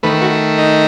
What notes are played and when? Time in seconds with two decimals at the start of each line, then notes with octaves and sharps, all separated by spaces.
0.03 D#3 A3 B4
0.21 F#4
0.58 D#4